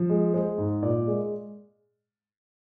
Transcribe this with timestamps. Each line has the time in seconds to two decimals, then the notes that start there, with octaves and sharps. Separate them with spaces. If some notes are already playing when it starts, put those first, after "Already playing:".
Already playing: F3
0.09 G#3
0.34 G#3 C5
0.58 G#2
0.83 A#2 D5
1.07 G#3